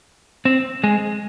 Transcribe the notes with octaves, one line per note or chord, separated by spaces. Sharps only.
C4
G#3